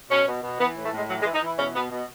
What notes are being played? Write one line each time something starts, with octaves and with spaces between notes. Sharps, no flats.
B2 C#4
B2
B2
E3 B3
A2
A3
A2 G#3
E3 F#3
G#3
E3
D#4
E3 E4
B2 C#4
B2 B3
B2